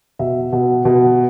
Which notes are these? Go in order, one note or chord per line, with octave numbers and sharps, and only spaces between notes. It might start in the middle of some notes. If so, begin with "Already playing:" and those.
B2 E5
B2
B2